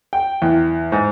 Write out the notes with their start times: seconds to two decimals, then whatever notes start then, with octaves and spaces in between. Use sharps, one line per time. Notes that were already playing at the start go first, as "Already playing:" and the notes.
0.13 G5
0.42 E2
0.92 G#2